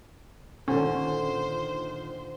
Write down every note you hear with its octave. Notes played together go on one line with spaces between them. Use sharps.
A#2 D3 D#3 C#4 C5